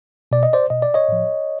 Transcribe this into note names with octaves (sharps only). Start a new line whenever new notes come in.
B2 D5
D#5
C5 D5
B2 D#5
D5
C#5 D#5
A2 F3